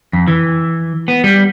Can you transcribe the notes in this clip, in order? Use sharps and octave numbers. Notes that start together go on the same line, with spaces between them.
F2
E3
B3
G3